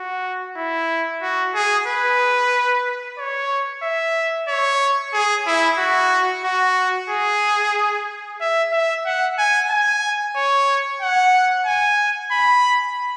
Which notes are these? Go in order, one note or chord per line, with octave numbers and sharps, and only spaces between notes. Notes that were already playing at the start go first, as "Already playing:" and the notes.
Already playing: F#4
E4
F#4
G#4
B4
C#5
E5
C#5
G#4
E4
F#4
F#4
G#4
E5
E5
F#5
G#5
G#5
C#5
F#5
G#5
B5